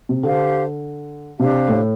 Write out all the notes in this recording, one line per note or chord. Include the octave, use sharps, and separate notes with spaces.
C3
D3 G4 C5 F5 A5
C3 D4 G4 C5 F5
A2